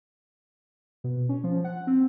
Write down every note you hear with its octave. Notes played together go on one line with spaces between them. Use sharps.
B2
C#4
F3
F#5
C4